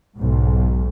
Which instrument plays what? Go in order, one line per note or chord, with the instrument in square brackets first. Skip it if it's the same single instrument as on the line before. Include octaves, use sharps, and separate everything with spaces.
[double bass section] B1 G#2